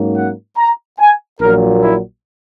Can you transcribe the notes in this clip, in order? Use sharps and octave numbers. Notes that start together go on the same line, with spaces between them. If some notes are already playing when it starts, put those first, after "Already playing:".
Already playing: G#2 F#3 A#3 C#4
F#5
A#5
G#5
A#1 A#2 F#3 A#3 A#4
E4